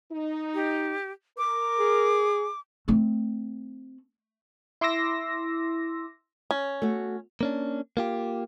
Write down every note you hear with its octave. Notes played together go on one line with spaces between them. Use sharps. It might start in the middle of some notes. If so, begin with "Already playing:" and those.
D#4
G4
A#4 D6
G#4
A3 C4
E4 C6 D6 E6 A#6
C#4
A3 F#4
A#3 C#4 D4
A#3 F4 G4